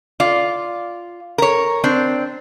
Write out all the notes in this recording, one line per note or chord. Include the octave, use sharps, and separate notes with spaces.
F4 D5
A#4 C#5
C4 D4